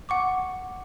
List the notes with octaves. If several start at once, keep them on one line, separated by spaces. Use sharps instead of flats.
F#5 C#6 D6